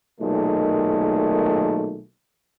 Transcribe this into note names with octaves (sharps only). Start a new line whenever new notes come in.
B1 A#2 D#3 G#3 A3